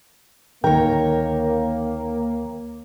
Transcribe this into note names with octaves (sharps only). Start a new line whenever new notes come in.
D2 D#3 A#3 A#4 C#5 G5